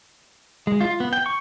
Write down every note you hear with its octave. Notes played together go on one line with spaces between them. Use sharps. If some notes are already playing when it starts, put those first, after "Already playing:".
G#3
F4
B3
G5
C#6